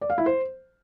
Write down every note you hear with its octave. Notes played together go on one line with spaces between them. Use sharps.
D5
F5
E4
C5